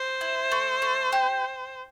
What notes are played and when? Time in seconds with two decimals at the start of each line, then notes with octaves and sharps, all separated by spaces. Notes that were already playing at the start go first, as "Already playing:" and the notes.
Already playing: C5
0.21 E4
0.51 A3
0.82 A3
1.12 G4